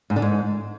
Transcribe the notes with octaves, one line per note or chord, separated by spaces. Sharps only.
G#2
D3
G#2